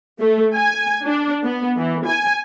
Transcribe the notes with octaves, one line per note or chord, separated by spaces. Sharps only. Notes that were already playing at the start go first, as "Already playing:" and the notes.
A3
G#5
D4
B3
E3
G#5